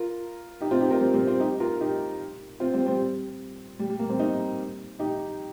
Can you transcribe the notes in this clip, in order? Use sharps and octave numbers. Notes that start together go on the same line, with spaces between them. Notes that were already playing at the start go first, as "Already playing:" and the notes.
Already playing: F4 A#4
D#4 G4
C4 F4
D#4 G4
F4 A#4
G3 C4
G3 C4
C4 F4
D#4 G4
F4 A#4
D#4 G4
C4 F4
G3 C4
G3 C4
G3
G3
A#3
G3 C4
A#3 D#4
D#4 G4